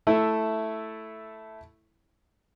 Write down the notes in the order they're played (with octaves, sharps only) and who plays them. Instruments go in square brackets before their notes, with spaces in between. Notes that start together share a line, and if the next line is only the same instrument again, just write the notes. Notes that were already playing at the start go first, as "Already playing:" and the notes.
[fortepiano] A3 E4 A4